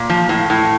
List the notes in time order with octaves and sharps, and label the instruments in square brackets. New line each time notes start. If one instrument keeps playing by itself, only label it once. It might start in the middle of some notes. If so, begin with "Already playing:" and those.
Already playing: [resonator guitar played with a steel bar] A#2
F3
A2
A2